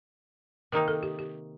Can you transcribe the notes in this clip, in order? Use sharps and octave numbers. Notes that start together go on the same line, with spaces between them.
C3 D#3 A#3 D#4 A#4
A4
G4
G4